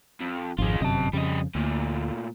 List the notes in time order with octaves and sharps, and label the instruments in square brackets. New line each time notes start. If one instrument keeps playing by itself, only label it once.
[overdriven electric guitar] F2
[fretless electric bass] G#1 F2 [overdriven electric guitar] G#3 F4
[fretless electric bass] G1 F#2 C3 [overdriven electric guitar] D#5 A5
[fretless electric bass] F2 C#3 [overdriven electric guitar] G3 D#5
[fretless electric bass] D2 [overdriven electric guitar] A#2 A3